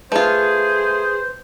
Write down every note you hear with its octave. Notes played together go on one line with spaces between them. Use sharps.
A3 F4 G#4 B4 C5